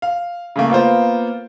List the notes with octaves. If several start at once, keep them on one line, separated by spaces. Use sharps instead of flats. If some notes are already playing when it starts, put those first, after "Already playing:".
F5
C#3 A3 A#3
A#3 B3 F4 C5